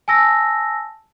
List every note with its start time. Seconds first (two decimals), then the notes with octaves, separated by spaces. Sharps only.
0.08 G#5 A5 E6 A#6